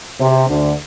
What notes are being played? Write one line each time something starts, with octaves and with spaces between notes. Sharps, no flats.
C3
D2 D3